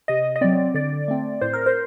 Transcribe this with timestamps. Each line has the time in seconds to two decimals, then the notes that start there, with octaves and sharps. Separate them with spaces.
0.08 C3 D#5
0.36 D#5
0.41 F#3 C4 D5
0.74 D3 D5
1.08 A3 C4
1.41 A2 C5
1.53 A#4
1.66 C5